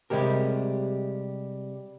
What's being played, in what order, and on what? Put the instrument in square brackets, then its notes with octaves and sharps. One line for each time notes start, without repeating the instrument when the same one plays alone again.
[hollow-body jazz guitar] C3 G3 G#3 G4 A#4